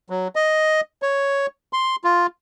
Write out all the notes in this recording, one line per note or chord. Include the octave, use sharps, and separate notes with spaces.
F#3
D#5
C#5
C6
F4